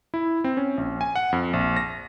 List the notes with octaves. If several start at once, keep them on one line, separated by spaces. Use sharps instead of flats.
E4
C4
C#4
A#1
G#5
F#5
F2
A#1
A#6